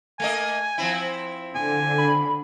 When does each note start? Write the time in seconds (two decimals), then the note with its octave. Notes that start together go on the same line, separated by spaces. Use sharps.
0.20 A3 A#3 D#5 G#5
0.78 F3 C4 E4
1.55 D3 G#5
1.98 B5